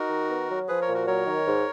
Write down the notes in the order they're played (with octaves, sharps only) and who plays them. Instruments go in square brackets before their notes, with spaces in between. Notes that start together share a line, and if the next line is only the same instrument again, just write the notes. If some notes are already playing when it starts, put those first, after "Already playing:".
Already playing: [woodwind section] D#4 [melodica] F#4 A#4
[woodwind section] D#3
B3
F#3
[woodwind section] F3 [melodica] G#4 B4
[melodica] A#4 C#5
[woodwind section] A#2
[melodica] F#4 A#4
[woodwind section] F#3 [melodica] A#4 C#5
[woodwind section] D#3
G#2